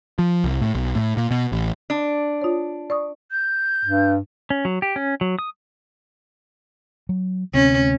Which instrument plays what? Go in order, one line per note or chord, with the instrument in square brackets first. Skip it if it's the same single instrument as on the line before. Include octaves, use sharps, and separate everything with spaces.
[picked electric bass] F3
C2
A2
B1
A2
A#2
B2
A1
[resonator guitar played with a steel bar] D4
[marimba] F4 C#5
D5 C#6 D#6
[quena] G6
[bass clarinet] G2
[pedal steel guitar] C#4
F#3
G4
C#4
F#3
D#6
[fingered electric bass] F#3
[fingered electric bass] D2 C3 C4 [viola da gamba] C#4